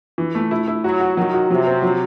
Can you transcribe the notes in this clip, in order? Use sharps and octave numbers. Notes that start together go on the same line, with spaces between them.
E3
A3
E4
E4
F#3 F#4
F#4
D#3 F#3
F#4
C3 F#3
C4
F#3